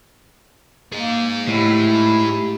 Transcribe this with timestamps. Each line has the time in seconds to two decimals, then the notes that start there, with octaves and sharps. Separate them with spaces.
0.93 A#3 D#4 G#4
1.48 A2 E4 G4